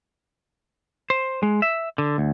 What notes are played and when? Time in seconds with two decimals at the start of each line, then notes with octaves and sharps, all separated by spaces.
1.10 C5
1.43 G#3
1.62 E5
1.98 D3
2.18 D2